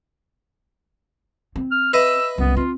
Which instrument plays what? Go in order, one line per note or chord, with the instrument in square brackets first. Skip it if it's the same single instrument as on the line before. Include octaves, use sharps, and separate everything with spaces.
[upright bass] C4
[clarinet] F6
[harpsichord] B4 D#5 E5 [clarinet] E6
[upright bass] C2 F#2 [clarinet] B3
[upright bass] C4 [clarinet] F4